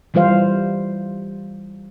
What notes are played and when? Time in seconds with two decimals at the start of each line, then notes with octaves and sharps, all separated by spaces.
0.14 E3 G3 F4 C5 F5